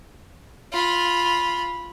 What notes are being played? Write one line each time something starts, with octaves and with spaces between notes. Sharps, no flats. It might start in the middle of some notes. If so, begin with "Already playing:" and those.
F4 B5